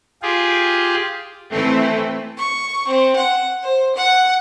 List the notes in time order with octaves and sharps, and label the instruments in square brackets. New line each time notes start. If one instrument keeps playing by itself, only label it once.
[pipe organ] F4 G4 G#4
[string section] E3 C4 E4 [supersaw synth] A3
[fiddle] C#6
C4
F#5
C5
F#5